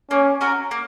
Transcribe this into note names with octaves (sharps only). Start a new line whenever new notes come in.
A#3 C#4
C#4 F#4 A#4
A#3